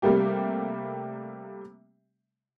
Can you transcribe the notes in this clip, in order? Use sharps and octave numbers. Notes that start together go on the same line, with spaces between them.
C3 G3 A3 A#3 G4